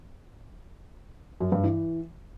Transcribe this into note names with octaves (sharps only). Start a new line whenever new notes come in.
F#2
G2
E3